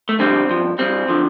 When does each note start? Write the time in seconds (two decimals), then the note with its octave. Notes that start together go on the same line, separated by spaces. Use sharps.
0.09 A3
0.19 F2 D3 G3 C4
0.49 G2 F3
0.79 G2 G3 C4
1.08 D3 F3